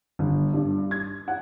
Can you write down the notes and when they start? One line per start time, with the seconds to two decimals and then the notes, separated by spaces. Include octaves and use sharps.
0.19 G1
0.53 G2
0.91 G#6
1.28 F#5